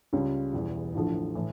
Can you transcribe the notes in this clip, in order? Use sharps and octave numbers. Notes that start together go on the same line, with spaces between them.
C#2 C#3 G3 C#4 F4
E1 E2 E3 G3
A1 G2 D3 F3 A3
A2 E3